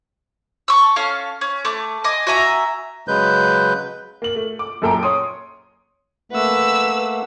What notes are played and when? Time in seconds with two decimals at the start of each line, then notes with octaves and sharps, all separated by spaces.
0.68 A5 C#6 E6
0.96 C#4 A4 F5 C#6
1.41 C#4
1.65 A3 D6
2.04 D#5 G#5 D6
2.27 F#4 E5 G#5 A#5
3.08 C#3 F#3 G#3 B4 G6
4.22 A#3 F#7
4.36 A3
4.59 D6
4.82 F#2 A#2 A4 G5 A#5 D7
5.03 C#5 C6 D#6
6.32 A3 A#3 B4 F#5 E6